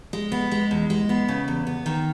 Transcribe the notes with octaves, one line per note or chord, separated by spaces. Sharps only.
G#3
B3
G#3
E2
G#3
B3
C#3
E2
B3
D#3